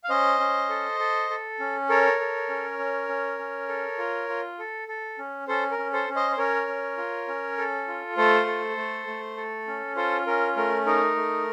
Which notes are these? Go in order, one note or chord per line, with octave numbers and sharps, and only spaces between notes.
F5
C#4 C5 D#5
C#4
A4
A4
A4
C#4
A4 A#4 C#5
A4
C#4
C#4
C#4
C#4
A4
F4
F4
A4
A4
C#4
C#4 A4 C5
A#4
C#4
A4 C5
C#4
C5 D#5
C5
C#4 A#4 C#5
C#4
F4
C#4
A4
F4
A3 A4 C5
A4
A3
A3
A4
C#4
F4 A4 C5
C#4 A#4
A3 A#4
D#4 A#4
A3